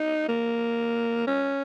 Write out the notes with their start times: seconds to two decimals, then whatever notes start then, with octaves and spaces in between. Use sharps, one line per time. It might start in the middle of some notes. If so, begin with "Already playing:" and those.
Already playing: D#4
0.29 A#3
1.27 C#4